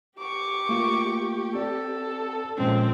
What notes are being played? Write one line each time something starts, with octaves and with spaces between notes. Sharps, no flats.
G4 C#6 D6
A3 A#3 F4
C4 A4 D5
A#2 F3 G#3 C4 C#4